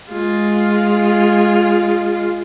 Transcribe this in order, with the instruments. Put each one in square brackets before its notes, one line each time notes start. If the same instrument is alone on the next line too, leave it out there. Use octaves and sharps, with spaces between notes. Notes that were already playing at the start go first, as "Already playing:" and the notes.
[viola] G#3 F4